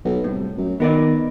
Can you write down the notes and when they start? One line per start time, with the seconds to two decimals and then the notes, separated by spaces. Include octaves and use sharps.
0.05 B1
0.24 C2 A2
0.57 F#2
0.80 D#3 B3 A#4 D5